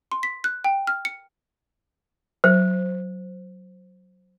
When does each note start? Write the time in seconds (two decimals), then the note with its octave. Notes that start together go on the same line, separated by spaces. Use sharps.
0.12 C6
0.23 B6
0.44 F#6
0.64 G5
0.87 F6
1.05 C#7
2.44 F#3 C5